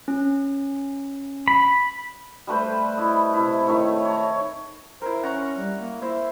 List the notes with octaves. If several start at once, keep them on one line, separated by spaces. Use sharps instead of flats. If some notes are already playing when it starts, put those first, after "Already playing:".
C#4
B5
G3 A3 B4 C5
E4 D#5
C3 E4
D#3 A3 E4 C#5
C#5
C#5 A#5
E4 A#4 C5
C#4 F#5 A#5 C#6
G3
A#3
E4 C5 E5